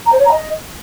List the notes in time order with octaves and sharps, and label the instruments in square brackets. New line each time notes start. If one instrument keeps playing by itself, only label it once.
[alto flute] A#5
C5
C#5
A#5
D#5